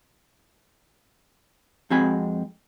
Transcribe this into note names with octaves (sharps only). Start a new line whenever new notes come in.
F2 G#3 C4 F#4 G#5 B5